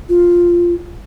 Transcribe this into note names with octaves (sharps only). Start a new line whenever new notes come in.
F4